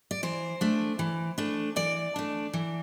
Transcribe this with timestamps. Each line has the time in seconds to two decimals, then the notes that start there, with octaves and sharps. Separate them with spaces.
0.11 D5
0.23 E3 C5
0.61 A3 D4
0.99 E3
1.38 A3 D4
1.76 E3 D5
2.16 A3 D4
2.53 E3